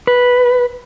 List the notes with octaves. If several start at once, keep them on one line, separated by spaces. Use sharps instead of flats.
B4